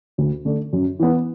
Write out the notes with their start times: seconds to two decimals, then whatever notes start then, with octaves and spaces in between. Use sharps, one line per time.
0.18 D2
0.45 D3 A3 D4
0.73 F#2
0.99 E3 B3